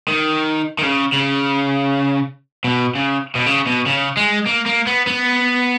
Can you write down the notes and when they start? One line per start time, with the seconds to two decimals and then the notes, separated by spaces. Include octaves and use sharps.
0.08 D#3
0.79 D#3
0.83 C#3
1.13 C#3
2.64 B2
2.95 C#3
3.35 B2
3.46 C#3
3.67 B2
3.86 C#3
4.17 G#3
4.47 A#3
4.66 A#3
4.87 B3
5.07 B3